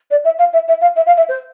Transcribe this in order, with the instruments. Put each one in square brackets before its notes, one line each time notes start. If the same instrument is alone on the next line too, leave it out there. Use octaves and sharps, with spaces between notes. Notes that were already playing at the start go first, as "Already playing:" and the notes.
[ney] D5
E5
F5
E5
E5
F5
E5
F5
E5
C5